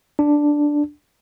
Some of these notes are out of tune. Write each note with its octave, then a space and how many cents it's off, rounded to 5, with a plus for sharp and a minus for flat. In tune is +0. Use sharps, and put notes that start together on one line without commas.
D4 +0